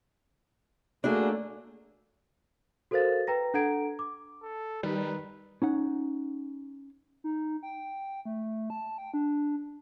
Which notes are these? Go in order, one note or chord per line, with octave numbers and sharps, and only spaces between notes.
A3 A#3 D4 F#4 G#4
F#4 A4 A#4 C5 F5 A6
B4 G5 A#5 A#6
D4 A4 F#5 A#5 G#6 D7
D6
A4
D#3 G3 D#4 B4
C#4 D#4 F#5
D#4
G5
A3
A5
G5
D4